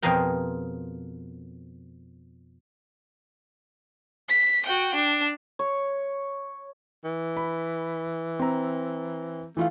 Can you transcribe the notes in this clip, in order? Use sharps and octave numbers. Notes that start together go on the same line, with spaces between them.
F2 B2 F3 G#4 A#4 G5
B6
F#4 G5
D4
C#5
E3
B5
C4 A#5
E3 A3 F4 F5